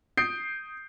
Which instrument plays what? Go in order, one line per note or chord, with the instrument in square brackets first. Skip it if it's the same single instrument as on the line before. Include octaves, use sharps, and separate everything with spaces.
[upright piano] D#6 G6 C7 D7